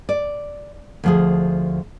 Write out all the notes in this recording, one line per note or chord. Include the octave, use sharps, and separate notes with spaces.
D5
D2 F3 G#4